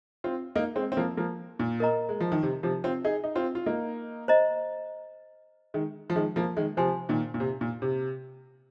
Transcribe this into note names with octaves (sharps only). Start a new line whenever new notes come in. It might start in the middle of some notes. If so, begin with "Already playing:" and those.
C4 F4
A#3 D#4
G#3 C4
C4
F3 A#3
F3 A#3
A#2
A#4 D#5 A#5
G#3
F3
D#3
C3
C3 F3
C4 F4
D#4 G#4
D#4
C4 F4
F4
A#3 D#4
C5 D#5 A#5
D#3 G#3
F3
D#3 G#3
F3 A#3
D#3 G#3
C3 F3 C5 G#5 C6
A#2 D#3
A#2
C3
A#2
C3